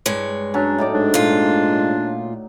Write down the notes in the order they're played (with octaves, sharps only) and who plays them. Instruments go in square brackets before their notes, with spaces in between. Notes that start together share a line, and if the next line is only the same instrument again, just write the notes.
[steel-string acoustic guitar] G2 G#3 C#5
[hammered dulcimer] F#3 C#4 [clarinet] D4
[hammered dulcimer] A2 D#4 D5
[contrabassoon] G#2 [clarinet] D4
[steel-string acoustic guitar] A#2 F4